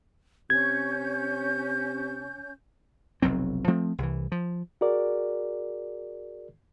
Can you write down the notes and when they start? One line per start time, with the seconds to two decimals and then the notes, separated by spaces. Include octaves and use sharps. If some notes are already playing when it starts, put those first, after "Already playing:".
0.50 C3 C#4 G6 G#6
3.22 F1 B1 F#3 C4
3.68 F3 A3 C4
3.98 C2 E3
4.32 F3
4.81 F#4 G#4 A#4 D5